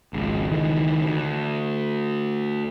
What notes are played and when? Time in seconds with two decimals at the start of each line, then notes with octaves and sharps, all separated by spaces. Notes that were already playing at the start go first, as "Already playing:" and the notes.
0.13 G#1 C#2
0.52 C#2 D#3 E3
1.06 D2